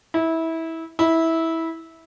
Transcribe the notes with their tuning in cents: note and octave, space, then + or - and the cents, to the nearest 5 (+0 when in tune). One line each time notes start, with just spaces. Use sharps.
E4 -20
E4 -15